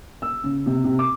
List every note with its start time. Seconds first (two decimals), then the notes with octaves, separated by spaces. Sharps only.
0.22 E6
0.44 C#3
0.66 C3
0.84 C3
0.99 D6